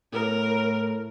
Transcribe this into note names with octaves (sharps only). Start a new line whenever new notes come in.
A2 A#4